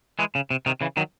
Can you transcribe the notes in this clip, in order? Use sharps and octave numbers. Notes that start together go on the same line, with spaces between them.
E3 G#3
C#3
C3
C3 D#3
C#3 E3
D#3 F#3